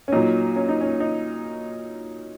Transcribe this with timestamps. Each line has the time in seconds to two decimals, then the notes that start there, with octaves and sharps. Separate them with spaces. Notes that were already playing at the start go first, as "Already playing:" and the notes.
0.08 C#4
0.12 A#2 F#3 D#4
0.56 C#4
0.69 D#4
0.81 C#4
1.00 D#4